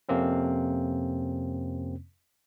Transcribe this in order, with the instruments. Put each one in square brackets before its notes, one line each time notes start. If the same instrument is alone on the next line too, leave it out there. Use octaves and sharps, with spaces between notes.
[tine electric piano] F2 C3 A#3 C4 C#4